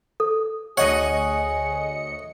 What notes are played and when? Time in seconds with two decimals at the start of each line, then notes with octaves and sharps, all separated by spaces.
0.20 A4
0.77 D2 G#4 C#5 D#5 F#5 C#7